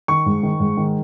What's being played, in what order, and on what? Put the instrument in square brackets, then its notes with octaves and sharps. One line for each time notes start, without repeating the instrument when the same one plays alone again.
[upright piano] D#3 C#6
G#2
D#3
G#2
D#3